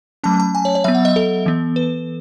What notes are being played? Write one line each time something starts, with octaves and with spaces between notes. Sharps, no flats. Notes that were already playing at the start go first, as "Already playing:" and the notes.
F#3 A3 C#4 A5
A5
G#5
C#5
C#5
F#3 B3 E5
F#5
D#5
A4
E3 B3
B4